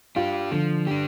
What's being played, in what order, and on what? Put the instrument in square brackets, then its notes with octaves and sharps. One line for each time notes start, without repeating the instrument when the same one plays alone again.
[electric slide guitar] D4 G4 [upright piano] F4
[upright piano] D3 [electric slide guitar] F3
[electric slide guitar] D4 G4